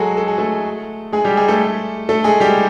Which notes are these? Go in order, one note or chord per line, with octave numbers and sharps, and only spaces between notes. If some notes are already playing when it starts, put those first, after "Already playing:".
Already playing: F#3 G#3 F#4 G#4 A4
A4
G#4
A3 A4
G#3 G#4
G3 G4
G#3 G#4
A3 A4
A3 A4
G#3 G#4
G3 G4